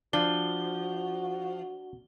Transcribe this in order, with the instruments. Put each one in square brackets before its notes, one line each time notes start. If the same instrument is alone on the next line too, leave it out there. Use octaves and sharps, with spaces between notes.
[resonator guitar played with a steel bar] F3 [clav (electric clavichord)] D4 [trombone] F#4 [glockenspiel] G7